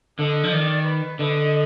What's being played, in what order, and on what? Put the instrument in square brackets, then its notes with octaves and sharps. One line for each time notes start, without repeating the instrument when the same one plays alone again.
[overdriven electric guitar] D3 [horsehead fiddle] D#5
[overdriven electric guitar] F3
[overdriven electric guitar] D#3 [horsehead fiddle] D5
[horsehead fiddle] B4
[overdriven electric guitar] D3 [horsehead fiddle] D#5